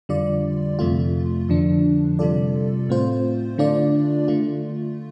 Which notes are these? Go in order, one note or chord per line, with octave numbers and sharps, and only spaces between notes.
F2 D3 G3 F4 D5
F2 C3 A3 F4
F2 D3 F3 D4
C3 G3 F4 A4 D5
A2 A3 C4 F4 C5
D3 A3 D4 F4 D5
D3 A3 F4